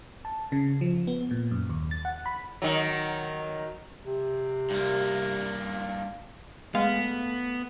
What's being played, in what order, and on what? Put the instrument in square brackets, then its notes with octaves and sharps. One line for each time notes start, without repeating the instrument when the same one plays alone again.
[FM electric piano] A5
C#3
F3
B3
A#2
F#2
D#2
A6
F#5
B5
[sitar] D#3 F#3
[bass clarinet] C3
[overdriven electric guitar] G2 A#3
[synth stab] G#3 F5 [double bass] A3 [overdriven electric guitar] B3